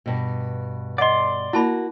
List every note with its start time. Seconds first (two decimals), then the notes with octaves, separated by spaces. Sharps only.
0.06 G2 B2
0.98 D5 D#5 F#5 C6
1.53 A#3 E4 F#4 A5 B5